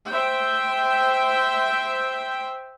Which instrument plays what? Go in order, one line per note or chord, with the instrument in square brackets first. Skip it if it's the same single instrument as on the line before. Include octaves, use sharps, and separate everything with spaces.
[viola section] C5 E5 G5